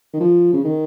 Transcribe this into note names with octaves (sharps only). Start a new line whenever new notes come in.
D#3
F3
C#3
D#3